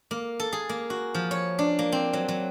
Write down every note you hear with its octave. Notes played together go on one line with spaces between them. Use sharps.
A#3
A4
G#4
A#3
F#4
F3
C#5
D4
A#3
C4
F#3
F#3